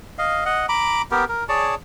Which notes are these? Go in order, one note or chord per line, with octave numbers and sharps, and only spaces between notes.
D#5 F5
D#5 F#5
A#5 B5 D6
B3 G4 A#4
A#4
G#4 C#5 D5 A5